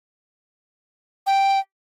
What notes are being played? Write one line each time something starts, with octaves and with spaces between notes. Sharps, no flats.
G5